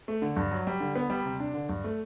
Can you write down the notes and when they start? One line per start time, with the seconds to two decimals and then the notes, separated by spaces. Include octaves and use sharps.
0.08 A3
0.22 D3
0.36 G2
0.52 F#3
0.67 G3
0.80 D3
0.96 B3
1.10 G3
1.26 C3
1.40 D4
1.54 D3
1.69 G2
1.84 A3